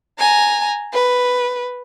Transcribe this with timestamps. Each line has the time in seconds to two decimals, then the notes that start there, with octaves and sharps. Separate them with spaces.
0.19 G#5 A#5
0.94 B4